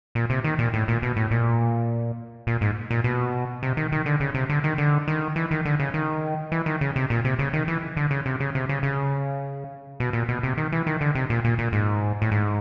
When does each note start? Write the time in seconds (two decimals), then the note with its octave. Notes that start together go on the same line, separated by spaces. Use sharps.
0.15 A#2
0.30 C3
0.44 D#3
0.59 A#2
0.74 A2
0.88 A#2
1.02 B2
1.17 A2
1.31 A#2
2.47 A#2
2.61 G#2
2.91 A#2
3.04 B2
3.63 C3
3.77 D#3
3.92 D#3
4.06 D3
4.20 C#3
4.34 C3
4.49 D3
4.64 D#3
4.78 D3
5.08 D#3
5.36 E3
5.51 D#3
5.65 D3
5.80 C#3
5.94 D#3
6.52 E3
6.66 D#3
6.81 C#3
6.96 C3
7.10 A#2
7.25 C3
7.39 C#3
7.53 D#3
7.68 E3
7.97 D3
8.11 C#3
8.26 C3
8.40 C#3
8.55 C3
8.69 C#3
8.83 C#3
10.00 B2
10.13 A#2
10.29 B2
10.43 C3
10.57 D#3
10.72 E3
10.86 D#3
11.01 D3
11.15 C3
11.30 A#2
11.44 A#2
11.58 A#2
11.72 G#2
12.22 A2
12.31 G#2